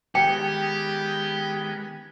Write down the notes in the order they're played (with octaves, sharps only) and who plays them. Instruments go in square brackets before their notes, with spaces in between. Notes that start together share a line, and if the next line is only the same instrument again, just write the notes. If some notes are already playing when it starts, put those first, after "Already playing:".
[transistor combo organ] D#3 G#3 B3 [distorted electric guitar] G4 [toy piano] G5